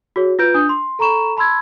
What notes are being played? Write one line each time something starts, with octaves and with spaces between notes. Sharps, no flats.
F#4 G#4 C#5
F4 B4 G6 D7
D4 D#6 G6
C6
A4 A#5 B5 C#6 E7
A5 B5 C6 E6 G#6